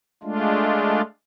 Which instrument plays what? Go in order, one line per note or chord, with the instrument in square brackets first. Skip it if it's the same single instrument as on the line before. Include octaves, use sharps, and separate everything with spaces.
[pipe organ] G#3 A3 D4 F4